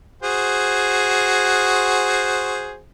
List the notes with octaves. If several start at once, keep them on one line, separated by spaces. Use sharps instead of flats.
F#4 G#4 C5